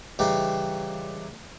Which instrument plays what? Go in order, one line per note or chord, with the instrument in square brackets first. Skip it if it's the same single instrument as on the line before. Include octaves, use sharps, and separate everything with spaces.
[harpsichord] C#3 E3 G3 D#4 G4